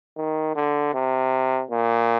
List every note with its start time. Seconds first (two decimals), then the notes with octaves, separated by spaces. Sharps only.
0.17 D#3
0.56 D3
0.94 C3
1.71 A#2